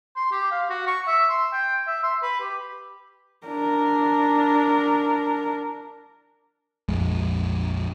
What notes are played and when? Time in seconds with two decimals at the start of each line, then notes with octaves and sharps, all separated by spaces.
0.16 C6
0.32 G4
0.51 F5
0.70 F#4
0.87 C#6
1.08 E5
1.30 C6
1.53 G5
1.87 E5
2.03 C6
2.22 B4
2.41 G4
3.47 D4 A#4
6.89 A#1 F2 G#3